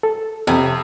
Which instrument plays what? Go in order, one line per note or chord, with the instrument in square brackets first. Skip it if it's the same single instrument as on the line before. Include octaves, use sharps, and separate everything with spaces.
[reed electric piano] A4
[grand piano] F2 [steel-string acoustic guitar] C3